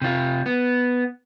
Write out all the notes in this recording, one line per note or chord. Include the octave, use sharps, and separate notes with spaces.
C3 F4
B3